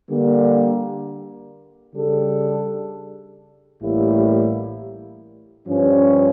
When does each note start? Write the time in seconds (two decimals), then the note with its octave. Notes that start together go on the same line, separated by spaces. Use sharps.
0.10 D3 G3 A#3
1.96 C#3 G3 D4 A4
3.81 A1 A2 G3 A#3 E4
5.67 G2 F3 C#4